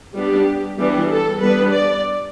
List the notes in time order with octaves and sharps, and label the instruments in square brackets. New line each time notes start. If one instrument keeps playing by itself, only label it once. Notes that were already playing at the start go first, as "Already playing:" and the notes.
[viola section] G3 B3 D4 G4
E3 G3 B3 D4 G4
A4
G3 B3 D4 B4
D5